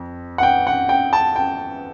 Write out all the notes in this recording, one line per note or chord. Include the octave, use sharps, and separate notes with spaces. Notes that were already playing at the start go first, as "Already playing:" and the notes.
Already playing: F2
F#5
G5
F#5
G5
A5
G5